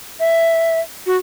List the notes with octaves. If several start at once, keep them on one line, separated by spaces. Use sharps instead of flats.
E5
F#4